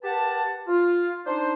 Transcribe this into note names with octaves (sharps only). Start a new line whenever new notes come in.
G4 A#4 B4 F#5 A5
F4
D4 D#4 C5